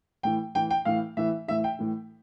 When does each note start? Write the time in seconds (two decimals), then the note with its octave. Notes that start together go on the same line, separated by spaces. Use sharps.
0.23 A2 E3 G5
0.55 A2 E3 G5
0.71 G5
0.85 A2 E3 F5
1.17 A2 E3 E5
1.48 A2 E3 E5
1.64 G5
1.79 A2 E3